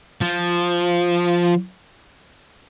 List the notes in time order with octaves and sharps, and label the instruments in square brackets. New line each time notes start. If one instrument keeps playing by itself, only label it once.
[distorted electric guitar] F3